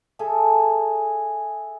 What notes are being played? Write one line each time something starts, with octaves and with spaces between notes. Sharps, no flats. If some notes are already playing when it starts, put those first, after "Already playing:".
G#4 A4 E5